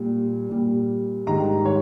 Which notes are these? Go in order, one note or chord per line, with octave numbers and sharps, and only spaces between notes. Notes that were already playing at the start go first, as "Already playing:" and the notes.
Already playing: A#2 G3
A#2 G3
G#2 D#3 G3 A#5
C#5